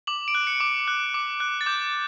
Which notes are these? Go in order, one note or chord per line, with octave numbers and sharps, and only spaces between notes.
D6 F#7
D7
F#6
C#7
D6
F#6
D6
F#6
A6
D6 G6